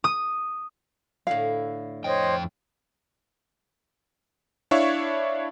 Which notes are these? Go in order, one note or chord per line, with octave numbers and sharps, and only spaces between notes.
D#6
A2 D3 E4 F5
F2 C5 C#5 D#5 G5
D4 E4 C#5 E5 F5 C#6